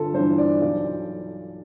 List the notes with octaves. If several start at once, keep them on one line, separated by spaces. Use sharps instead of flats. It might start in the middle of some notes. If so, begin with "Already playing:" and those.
Already playing: G1 F4 A4
G2 E3 C5
D5
B1